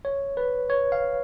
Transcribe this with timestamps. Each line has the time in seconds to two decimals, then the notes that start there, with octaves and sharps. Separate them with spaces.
0.05 C#5
0.37 B4
0.70 C#5
0.92 F5